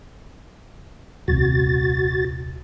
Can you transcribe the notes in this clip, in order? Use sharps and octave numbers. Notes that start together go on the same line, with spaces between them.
D#1 C2 F#4 A6